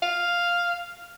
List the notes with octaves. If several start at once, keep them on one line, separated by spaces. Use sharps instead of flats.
F5